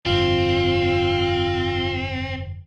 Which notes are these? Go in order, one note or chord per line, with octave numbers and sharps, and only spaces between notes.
F1 G2 D3 C4 F4